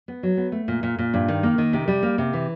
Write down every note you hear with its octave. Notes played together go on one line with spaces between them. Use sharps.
B3
F#3
B3
A3
A#2
A#2
A#2
G2
D#3
A#3
D#3
C3
G3
A#3
C3
E3